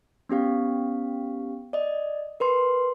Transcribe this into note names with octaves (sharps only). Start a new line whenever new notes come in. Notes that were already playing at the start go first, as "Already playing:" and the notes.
B3 C#4 G4 F5
D5 D#5
A#4 B4 C6